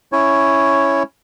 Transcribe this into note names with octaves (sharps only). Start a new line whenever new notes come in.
C#4 E4 C#5